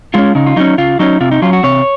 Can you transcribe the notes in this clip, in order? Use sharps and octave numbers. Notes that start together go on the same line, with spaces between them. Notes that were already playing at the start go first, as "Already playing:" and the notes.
G#3 C#4 F4
C#3 D#4
F4
F#3 C#4 D#4
C#3 F4
F#3 C#4 D#4
C3 F4
D#4
F#3 C#4 F4
F#4
C3 C#5